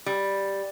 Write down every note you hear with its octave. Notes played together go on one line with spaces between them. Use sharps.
G3